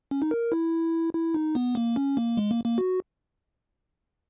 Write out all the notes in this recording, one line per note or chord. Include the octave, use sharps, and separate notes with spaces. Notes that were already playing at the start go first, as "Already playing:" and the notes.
C#4
D#4
A#4
E4
E4
D#4
B3
A#3
C#4
A#3
G#3
A#3
A#3
F#4